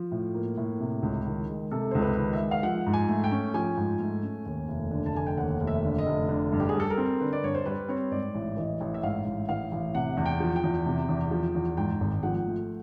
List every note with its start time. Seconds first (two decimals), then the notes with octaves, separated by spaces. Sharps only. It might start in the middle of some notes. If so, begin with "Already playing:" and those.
Already playing: F3
0.12 A2
0.34 A#3
0.57 A2
0.80 C3
1.03 C#2
1.26 D#3
1.49 G#3
1.71 C3 A4
1.91 C#2 C5
2.02 B4
2.17 D#3
2.33 E5
2.40 G#3
2.51 F5
2.63 F3 F#5
2.87 G#2
2.93 G#5
3.08 A3
3.24 G5
3.31 C#4
3.54 F3 G#5
3.77 G#2
4.00 A3
4.23 C#4
4.46 D#2
4.68 F1
4.91 D3
5.06 A5
5.14 F1 G#5
5.26 G5
5.37 D#2 F#5
5.60 F1
5.67 E5
5.83 D3
5.98 D#5
6.06 F1
6.29 D3
6.52 G2
6.60 G4
6.69 G#4
6.75 G3 A4
6.90 A#4
6.98 C4
7.20 D3 B4
7.33 D5
7.43 G2 C#5
7.55 C5
7.66 G3 B4
7.89 C4 C#5
8.11 G#2 D5
8.35 A1
8.57 E3 D#5
8.81 A1
8.94 E5
9.03 G#2 F5
9.26 A1
9.49 E3 F5
9.72 A1
9.95 C3 F#5
10.17 E2
10.26 G5
10.40 F3
10.56 G5
10.64 E2
10.86 C3
11.09 E2
11.31 F3
11.55 E2
11.77 G#2 G5
12.01 G#1
12.23 F3 F#5
12.47 A3